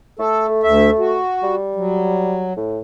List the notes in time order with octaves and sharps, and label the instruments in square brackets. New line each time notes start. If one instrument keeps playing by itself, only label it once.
[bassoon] A3 [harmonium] A4
[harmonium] D2 E5
F#4
[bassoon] G3
[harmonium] F#3
[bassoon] A2